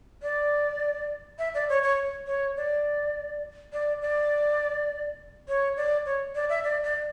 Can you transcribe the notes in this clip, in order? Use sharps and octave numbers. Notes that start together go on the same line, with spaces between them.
D5
E5
D5
C#5
C#5
C#5
D5
D5
D5
C#5
D5
C#5
D5
E5
D5
D5